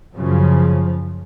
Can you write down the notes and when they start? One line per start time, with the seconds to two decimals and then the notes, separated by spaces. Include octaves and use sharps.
0.16 F#2 C#3 F3